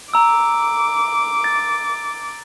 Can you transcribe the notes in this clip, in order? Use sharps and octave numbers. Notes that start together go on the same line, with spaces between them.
A#5 D6 E6
A6